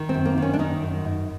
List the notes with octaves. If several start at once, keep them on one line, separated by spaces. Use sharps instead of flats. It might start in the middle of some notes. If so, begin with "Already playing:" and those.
Already playing: D#3
C4
F#2
A#3
D#3 C#4
D4
D#3 D#4
F#2
F#2